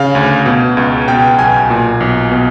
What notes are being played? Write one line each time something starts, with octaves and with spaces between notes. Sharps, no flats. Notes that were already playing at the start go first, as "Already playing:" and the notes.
Already playing: C#3 F5
D2
B2
C#2
B2 G5
B1 G#5
A#2
B1
B2